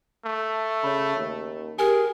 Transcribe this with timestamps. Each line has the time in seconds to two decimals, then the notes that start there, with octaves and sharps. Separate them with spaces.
0.25 A3
0.84 C#3 C#5 B5
1.17 D#2
1.79 G4 G#4 A#4 G#5